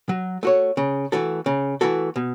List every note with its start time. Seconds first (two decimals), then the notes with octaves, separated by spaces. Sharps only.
0.09 F#3
0.43 A3 F#4 C#5
0.77 C#3
1.12 E3 A3 F#4 A4
1.46 C#3
1.81 E3 A3 F#4 A4
2.16 B2